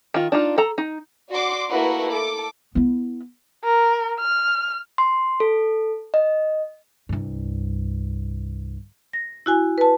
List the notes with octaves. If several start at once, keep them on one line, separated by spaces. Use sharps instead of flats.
D#3 F4
D4 D#4 F4
A4 A#5
D#4
F#4 D5 C6 D6
A3 A#3 E4 F#4 B4
A4 D6
B3 E4
A#4
F6
C6
A4
D#5
C2 G2
A#6
E4 F#4 G#5
B4 A5